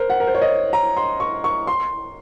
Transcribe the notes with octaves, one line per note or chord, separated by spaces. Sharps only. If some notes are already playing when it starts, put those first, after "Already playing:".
Already playing: A#4 C5
F#5
A#4
C5
C#5
D#5
A#5
C6
C#6
C#6
C6